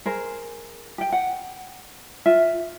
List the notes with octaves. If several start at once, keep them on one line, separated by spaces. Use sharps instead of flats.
G#4 A#4 C5
G4 G5
F#5 G5
F4 E5